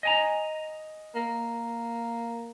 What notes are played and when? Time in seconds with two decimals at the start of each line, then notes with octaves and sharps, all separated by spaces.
0.03 D#5 G#5 A#5
1.15 A#3